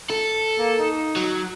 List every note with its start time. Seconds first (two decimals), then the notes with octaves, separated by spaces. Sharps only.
0.10 A4
0.58 A#3
0.79 D#4
1.16 F#3